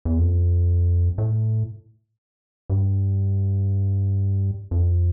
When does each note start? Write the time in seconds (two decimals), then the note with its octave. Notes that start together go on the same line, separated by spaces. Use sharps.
0.05 E2
0.18 F2
1.18 A2
2.70 G2
4.71 F2